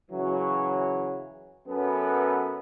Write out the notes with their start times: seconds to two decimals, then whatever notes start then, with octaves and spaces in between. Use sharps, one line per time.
0.11 C#3 E3 F#3
1.67 F#2 B3 A4 B4